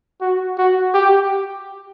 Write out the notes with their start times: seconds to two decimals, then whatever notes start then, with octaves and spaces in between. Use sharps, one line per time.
0.21 F#4
0.58 F#4
0.94 G4